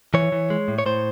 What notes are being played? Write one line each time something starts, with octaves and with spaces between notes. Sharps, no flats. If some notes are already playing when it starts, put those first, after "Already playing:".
E3 C#5
E3
G#3
A2
C#5
A2 C5